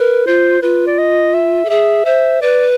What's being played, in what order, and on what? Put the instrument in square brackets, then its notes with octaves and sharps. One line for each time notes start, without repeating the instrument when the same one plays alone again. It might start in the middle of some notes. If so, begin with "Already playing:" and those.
Already playing: [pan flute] A#4 [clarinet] B4
[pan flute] F4 [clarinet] C5
[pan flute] F4 [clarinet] B4
[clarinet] D5
D#5
E5
[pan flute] A4
[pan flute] G#4 [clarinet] E5
[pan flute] C5 [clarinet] E5
[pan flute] B4 [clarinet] D5